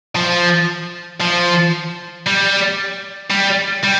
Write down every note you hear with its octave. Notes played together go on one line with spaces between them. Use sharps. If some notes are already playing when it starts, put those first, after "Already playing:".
F3
F3
G3
G3
G3